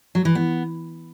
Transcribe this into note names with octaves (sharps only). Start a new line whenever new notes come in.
F#3
E3
B3